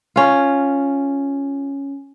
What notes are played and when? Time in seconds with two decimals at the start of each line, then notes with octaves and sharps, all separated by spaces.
0.16 C#4 F4